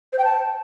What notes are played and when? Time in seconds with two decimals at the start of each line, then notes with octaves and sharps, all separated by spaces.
0.13 C5
0.19 G5
0.24 A5